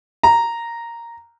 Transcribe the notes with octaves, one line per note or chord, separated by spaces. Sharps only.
A#5